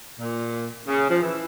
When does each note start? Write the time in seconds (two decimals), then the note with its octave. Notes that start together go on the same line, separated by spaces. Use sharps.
0.20 A#2
0.88 C#3
1.10 F3
1.23 E3